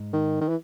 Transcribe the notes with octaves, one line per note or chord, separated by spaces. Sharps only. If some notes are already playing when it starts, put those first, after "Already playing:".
Already playing: G#2 G#3
D#3
D#3
E3